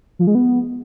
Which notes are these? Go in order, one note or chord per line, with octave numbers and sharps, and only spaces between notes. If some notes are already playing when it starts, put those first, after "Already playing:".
F3
G#3
B3